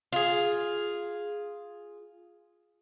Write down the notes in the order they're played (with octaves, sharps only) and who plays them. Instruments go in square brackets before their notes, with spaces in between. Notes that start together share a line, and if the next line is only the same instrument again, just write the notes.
[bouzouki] F4 G#4